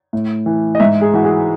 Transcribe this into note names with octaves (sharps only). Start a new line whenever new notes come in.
A2
E3
D#5
G#2 E5
G#4
E3 F#4
G#4